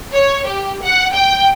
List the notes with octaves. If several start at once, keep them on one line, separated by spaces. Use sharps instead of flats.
C#5
G4
F#5
G5